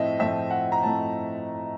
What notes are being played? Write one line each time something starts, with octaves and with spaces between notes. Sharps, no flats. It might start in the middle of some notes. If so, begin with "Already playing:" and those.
Already playing: A2 F3 A3 C4 D#5 E5
A2 F3 A3 C4 E5
F#5
A#5
A2 F3 A3 C4 A5